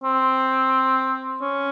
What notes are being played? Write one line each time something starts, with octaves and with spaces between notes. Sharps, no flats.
C4
C#4